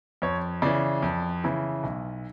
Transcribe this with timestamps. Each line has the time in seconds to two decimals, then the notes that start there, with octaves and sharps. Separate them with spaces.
0.22 F2 C#5
0.62 C#3 E3 D5
1.02 F2
1.44 C#3 E3
1.83 B1